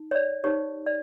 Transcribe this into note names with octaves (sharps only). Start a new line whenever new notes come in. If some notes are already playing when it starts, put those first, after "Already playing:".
Already playing: D#4
C#5
D5
D#4 G4 C5 C#5
D5